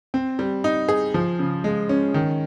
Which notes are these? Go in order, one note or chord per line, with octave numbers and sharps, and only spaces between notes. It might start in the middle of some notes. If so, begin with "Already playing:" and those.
C4
G3
D#4
G#4
F3
C#3
G#3
C#4
D#3